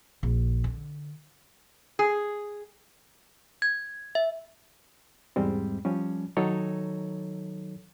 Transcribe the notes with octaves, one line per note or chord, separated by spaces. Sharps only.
A#1
D3
G#4
G#6
E5
E2 G#2 G3 G#3 C4
F3 G3 C#4
D#3 F#3 D#4 A4 C#5